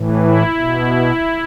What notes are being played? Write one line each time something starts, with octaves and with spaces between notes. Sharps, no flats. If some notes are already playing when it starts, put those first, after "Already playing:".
Already playing: A2 E3
E4
B2